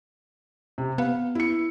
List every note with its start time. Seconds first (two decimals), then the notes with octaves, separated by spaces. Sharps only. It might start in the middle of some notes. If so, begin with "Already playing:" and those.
0.78 C3
0.98 B3 F5
1.35 E4 C#7